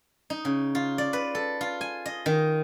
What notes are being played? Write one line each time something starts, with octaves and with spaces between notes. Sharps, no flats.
D#4
C#3
F4
D5
B4
A4
F4
G#5
D#5
D#3